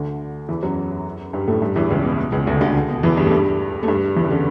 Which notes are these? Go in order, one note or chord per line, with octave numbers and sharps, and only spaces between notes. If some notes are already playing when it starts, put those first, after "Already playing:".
Already playing: D2 D3
E2 E3
F#2 F#3
G2 G3
A2 A3
G2 G3
E2 E3
C#2 C#3
B2
B2
C#2 C#3
D2 D3
D2 D3
B2
E2 E3
G2 G3
A3
G2 G3
A3
G2 G3
E2 E3
C#3
D3